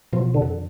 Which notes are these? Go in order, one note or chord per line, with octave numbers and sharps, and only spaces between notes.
B2 F3
D3
F2